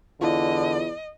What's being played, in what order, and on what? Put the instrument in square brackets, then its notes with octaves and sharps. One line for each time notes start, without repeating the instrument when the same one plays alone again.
[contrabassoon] E2 [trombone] D3 [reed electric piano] E4 F4 [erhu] D#5